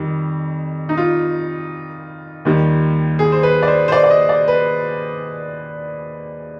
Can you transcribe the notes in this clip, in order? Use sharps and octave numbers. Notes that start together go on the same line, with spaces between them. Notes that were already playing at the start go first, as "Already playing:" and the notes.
Already playing: F2 D#3 G3
D#4
F4
D#2 D#3 G3
G#4
C5
B4
D5
C5
C5
D5
D5
D#5
D5
B4